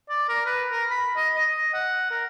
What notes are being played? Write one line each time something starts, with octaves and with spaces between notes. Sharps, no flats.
D5
A#4
B4
A#4
B5
D#5
D#5
F#5
A#4